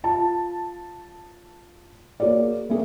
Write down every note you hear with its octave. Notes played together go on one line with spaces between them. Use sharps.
F4 A5
A#3 F#4 G#4 C#5 D5
A3 A#3 C4 G#4